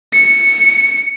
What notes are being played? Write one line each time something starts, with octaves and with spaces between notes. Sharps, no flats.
C#7